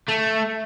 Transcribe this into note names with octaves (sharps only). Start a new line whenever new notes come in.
A3